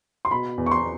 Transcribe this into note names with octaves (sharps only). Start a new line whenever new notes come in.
C6
B2 B5
E2
C#6
C6